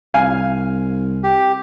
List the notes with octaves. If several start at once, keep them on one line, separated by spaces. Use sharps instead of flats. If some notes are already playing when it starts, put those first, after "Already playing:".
C2 F5 G#5
G4